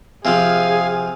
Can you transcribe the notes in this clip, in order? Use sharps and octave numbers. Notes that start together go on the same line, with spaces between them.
C3 F3 G#4 F5 G#5